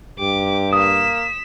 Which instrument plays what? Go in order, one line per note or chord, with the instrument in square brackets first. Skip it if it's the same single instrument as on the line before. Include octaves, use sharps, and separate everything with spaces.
[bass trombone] G2 [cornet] G4 [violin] D6
[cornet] A#3 [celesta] D#6 [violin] B6 E7